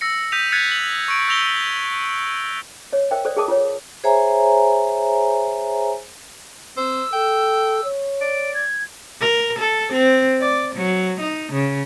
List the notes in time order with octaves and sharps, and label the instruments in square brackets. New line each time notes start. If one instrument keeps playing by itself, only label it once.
[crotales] E6 A#6 C#7
D#6 G6 B6 D#7 F7
F#6 G#6 A6 B6 C#7
F7 F#7
C#6 D7
E6 G6 A#6 F7 G7
[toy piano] C#5 D#5
A#4 C5 D#5 E5 G5
A4 C5 D5
G#4 A#4 D#5 A5 D6 D#6
F4 C#5
[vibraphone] G#4 C5 C#5 E5 G#5 A#5
[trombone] C4 [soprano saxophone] C5 [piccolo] E6
[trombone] A4 [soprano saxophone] G5
[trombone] C#5
[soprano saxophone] D5 [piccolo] D7
[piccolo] G#6
[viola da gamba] A#4
A4
C4
D5
F#3
D#4
C#3